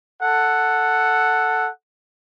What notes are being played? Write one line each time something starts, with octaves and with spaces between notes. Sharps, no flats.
A4 F#5